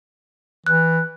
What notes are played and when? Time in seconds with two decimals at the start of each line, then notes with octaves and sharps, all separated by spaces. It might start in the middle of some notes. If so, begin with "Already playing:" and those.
0.67 E3 F#6